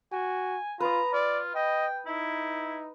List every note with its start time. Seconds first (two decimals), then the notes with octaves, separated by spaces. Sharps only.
0.12 F#4 G#5
0.80 F4 B4 A#5 D#6
1.13 F4 D5
1.55 D#5 G5
2.07 D#4 E4